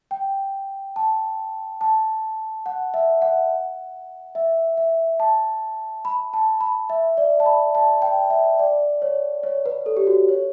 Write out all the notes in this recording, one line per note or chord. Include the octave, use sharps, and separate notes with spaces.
G5
A5
A5
F#5
E5
F#5
E5
E5
A5
B5
A5
B5
E5
D5
A5
B5
A5
G5
E5
D5
C#5
C#5
B4
A4
G4
F#4
C#5